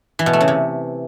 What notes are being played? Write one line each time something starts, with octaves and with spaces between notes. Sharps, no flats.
E3
B2
A3
C#3
C3